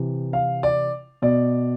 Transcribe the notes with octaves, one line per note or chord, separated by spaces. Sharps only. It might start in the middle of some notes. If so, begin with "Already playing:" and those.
Already playing: C3 E3
F5
D5
B2 D5